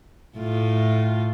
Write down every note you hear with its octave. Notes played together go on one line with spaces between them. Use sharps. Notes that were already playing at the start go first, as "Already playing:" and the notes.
A2 F4